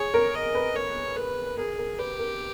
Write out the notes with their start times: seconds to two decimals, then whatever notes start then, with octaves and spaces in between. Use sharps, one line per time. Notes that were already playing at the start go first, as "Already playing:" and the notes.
Already playing: G#4 C#5
0.14 A#4
0.35 D#5
0.55 B4
0.75 A#4 C#5
1.16 A#4 B4
1.57 G#4 A#4
1.78 A#4
1.98 G4 B4
2.19 A#4